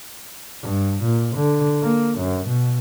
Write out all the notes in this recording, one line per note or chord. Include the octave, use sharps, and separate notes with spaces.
G2
A#2
D3
A#3
F#2
B2